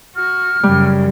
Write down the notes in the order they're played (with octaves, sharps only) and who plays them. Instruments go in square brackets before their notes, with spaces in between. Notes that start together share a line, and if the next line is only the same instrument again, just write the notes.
[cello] F#4 [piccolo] F6
[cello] F#2 C#3 [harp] G3